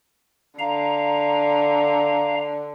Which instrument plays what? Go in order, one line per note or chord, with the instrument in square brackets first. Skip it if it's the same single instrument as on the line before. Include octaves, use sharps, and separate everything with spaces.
[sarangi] D3 [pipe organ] F5 A#5